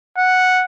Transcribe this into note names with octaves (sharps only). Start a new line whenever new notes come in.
F#5